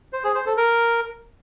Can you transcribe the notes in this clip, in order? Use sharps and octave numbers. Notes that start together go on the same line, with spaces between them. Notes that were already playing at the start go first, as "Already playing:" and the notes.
C5
G#4
C5
A4
A#4